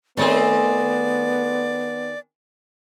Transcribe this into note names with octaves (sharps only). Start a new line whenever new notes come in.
D#3 A3 B3 C4 G#4 A4 C#5 D5